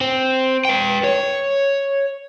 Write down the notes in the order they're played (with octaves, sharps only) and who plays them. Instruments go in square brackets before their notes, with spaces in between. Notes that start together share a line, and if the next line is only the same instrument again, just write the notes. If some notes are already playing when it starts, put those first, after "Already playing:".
[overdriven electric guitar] C4
B4 G5
C#5